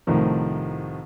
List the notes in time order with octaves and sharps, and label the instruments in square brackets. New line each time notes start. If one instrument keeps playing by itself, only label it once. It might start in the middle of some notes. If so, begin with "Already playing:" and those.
[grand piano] C2 A2 C3 D#3 F3